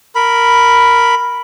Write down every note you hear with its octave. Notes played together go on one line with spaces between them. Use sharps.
A#4 B5